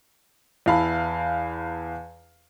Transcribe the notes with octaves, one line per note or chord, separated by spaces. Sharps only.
E2 E4 F5 A5 B5